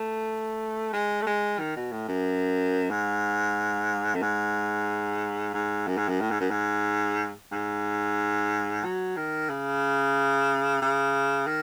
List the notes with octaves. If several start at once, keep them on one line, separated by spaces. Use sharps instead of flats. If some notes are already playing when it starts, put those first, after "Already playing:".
Already playing: A3
G#3
A3
G#3
D#3
B2
A2
F#2
G#2
F#2
G#2
G#2
F#2
G#2
F#2
A2
G#2
F#2
G#2
G#2
F#3
D#3
C#3
C#3
D#3